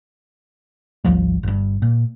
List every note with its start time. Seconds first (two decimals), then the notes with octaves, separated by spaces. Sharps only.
1.04 G#1 D2 F3 G3
1.43 G1 G2
1.82 A#2